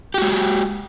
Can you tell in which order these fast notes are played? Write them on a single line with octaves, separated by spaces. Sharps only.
G4 F#4 G#3